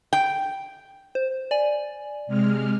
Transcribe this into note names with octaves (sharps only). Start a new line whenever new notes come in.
G5
C5
D5 G#5
C3 G#3 F6